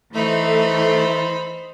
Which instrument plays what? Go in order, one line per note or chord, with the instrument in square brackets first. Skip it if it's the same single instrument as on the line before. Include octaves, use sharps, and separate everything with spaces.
[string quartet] E3 [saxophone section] A3 [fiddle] D#4 B5 [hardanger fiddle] C5